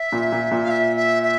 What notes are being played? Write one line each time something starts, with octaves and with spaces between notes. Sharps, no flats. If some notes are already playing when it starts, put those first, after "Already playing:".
Already playing: E5
A#2
A#2
A#2
F5
E5
E5
E5